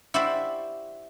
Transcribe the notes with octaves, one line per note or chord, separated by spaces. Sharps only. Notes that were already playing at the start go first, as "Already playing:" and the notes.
E4 F#4 G4 C5 D5 E5